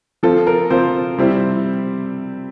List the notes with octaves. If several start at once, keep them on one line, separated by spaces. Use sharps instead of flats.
F3 C4 F4 A4
A#4
F3 C4 F4 C5
C3 G3 C4 E4